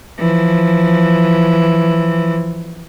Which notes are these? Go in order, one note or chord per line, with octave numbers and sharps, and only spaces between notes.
E3 F3